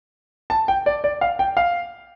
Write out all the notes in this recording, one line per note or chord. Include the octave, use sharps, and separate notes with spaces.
A5
G5
D5
D5
F5
G5
F5